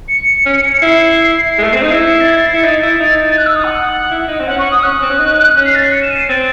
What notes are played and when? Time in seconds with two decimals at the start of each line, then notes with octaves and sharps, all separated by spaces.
0.08 C#7
0.46 C#4
0.82 E4 C7
1.58 G#3
1.64 A3
1.73 C4
1.82 D#4
1.91 E4
2.07 C#7
2.14 C7
2.21 A6
2.27 G#6
2.37 A6
2.47 C7
2.54 E4 C#7
2.64 D#4 A6
2.83 E4
3.00 D#4
3.37 F#6
3.46 E6
3.55 D#6
3.64 F#5
4.11 E4
4.28 D#4
4.40 C4
4.47 C#4 F#5
4.58 C#6
4.72 D#6
4.83 C#4 F#6
5.02 C4
5.10 C#4
5.19 D#4
5.56 C#4
5.65 C7
5.75 A6
5.83 C7
5.93 C#7
6.02 E7
6.11 D#7
6.20 C7
6.29 C4 A6